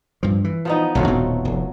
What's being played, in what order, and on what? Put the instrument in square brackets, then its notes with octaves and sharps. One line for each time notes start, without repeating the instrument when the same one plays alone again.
[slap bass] G2 F3
E3
[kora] F3 B3 D#4
[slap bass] B1 E2 D3 [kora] F#3 A3 F4
[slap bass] D#1 B2 C4
F1